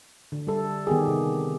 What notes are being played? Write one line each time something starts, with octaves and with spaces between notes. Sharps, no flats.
D3
G3 A4
D#3 B3 G4 G#4
C3